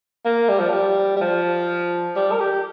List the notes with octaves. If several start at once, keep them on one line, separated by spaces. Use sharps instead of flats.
A#3
G3
F3
G3
G3
F3
G3
A#4
G4